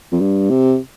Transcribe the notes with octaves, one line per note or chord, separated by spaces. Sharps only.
F2
G2
C3